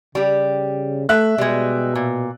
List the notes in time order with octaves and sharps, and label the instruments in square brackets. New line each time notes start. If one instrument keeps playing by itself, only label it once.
[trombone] C#3 [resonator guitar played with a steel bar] G3 G4
[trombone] A3 [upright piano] E5 F#6
[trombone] B2 [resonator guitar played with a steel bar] G3 G#3
[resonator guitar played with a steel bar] A#2